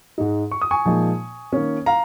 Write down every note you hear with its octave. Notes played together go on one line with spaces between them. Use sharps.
G#2 G#3 D#4
C#6
D#6
G#5 C#6
A#2 F3 G#3 D#4
D#3 A#3 C#4
F5 A#5